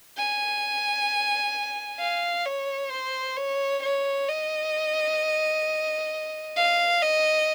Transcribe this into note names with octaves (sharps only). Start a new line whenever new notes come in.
G#5
F5
C#5
C5
C#5
C#5
D#5
F5
D#5